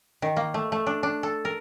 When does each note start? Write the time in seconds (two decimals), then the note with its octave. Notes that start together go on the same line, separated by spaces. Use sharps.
0.22 D#3
0.37 A#3
0.54 A3
0.72 A3
0.87 D4
1.03 D4
1.23 A4
1.45 A#4